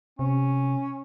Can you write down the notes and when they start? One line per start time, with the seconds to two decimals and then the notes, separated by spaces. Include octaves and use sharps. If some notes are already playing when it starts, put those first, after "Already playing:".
0.19 C3 C#4